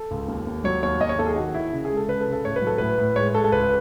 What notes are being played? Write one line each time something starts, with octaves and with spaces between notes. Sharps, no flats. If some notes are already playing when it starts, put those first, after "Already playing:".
Already playing: A4
C#2
D#2
D#2
F#3 C#5
D#2 C#5
D#2 D#5
C#5
D#2 A4
G#4
D#3 F#4
D#3 E4
C#3
G#4
G#3
A4
C#3 B4
A4
C#3
A4
A2 C#5
B4
F#3 A4
A2 B4
A2
G#3 C#5
G#3 A4
A4
C#2 B4